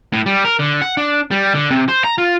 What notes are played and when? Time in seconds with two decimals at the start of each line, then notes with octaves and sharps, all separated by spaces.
0.13 A2
0.26 G3
0.44 A#4
0.59 D3
0.81 F#5
0.97 D4
1.31 G3
1.54 D3
1.71 C3
1.88 C5
2.04 A#5
2.18 F4